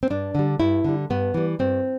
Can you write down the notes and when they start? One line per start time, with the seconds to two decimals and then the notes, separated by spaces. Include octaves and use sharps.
0.03 C4
0.10 G2 D4
0.35 D3 G3
0.60 G2 E4
0.84 D3 G3
1.10 G2 B3
1.34 E3 G3
1.59 G2 C4